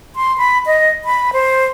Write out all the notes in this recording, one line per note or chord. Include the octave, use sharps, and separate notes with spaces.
C6
B5
D#5
B5
C5